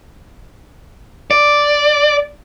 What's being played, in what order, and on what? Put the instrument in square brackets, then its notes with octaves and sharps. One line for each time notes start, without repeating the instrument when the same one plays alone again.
[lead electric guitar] D5